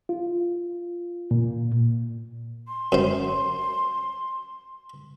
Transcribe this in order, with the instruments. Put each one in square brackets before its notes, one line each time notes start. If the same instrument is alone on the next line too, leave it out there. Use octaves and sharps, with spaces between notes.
[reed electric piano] F4
A#2
[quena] C6
[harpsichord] F#2 C5